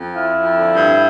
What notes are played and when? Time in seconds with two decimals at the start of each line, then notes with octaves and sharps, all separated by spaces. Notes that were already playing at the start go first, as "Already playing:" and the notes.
Already playing: F2
0.13 F3 E4
0.34 F2
0.55 D3
0.75 G2